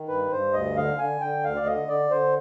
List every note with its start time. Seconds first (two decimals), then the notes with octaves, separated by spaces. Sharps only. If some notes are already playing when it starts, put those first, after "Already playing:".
Already playing: D#3
0.08 G2 B4
0.32 G2 C5
0.53 D2 D#5
0.76 D3 F5
0.98 D3 G#5
1.21 D3 G5
1.44 D2 F5
1.56 D5
1.66 D3 D#5
1.88 D3 D5
2.11 D3 C5